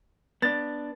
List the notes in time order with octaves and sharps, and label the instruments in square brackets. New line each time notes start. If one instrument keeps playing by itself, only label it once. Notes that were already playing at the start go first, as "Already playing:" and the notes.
[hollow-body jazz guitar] B3 D4 [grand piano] A6